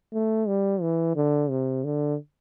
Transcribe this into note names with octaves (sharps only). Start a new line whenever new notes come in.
A3
G3
E3
D3
C3
D3